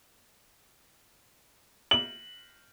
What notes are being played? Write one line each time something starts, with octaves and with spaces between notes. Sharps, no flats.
F#7